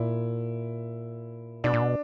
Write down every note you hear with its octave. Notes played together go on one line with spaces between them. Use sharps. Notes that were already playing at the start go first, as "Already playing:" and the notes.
Already playing: A#2 E4
B2 D4
A#2
B2